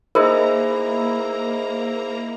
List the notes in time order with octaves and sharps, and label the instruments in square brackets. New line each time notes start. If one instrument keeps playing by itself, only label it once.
[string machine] A#3 A#5 [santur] D#4 E4 [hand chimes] G#4 C5 [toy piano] A#4